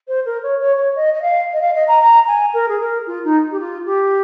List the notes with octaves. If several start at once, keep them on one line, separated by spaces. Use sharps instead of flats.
C5
A#4
C#5
C#5
C#5
D#5
D#5
F5
D#5
F5
D#5
A#5
A#5
G#5
A#4
G#4
A#4
F4
D#4
G4
F4
G4